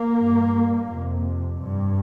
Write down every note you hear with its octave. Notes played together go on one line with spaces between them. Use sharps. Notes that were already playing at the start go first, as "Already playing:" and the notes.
Already playing: A#3
G2
F2 C3
G2